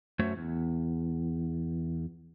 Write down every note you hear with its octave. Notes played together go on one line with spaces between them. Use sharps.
F#2 A3 F#4 C5 C#5 E5
E2